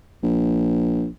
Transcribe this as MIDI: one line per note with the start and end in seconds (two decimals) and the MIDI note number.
0.23 1.07 34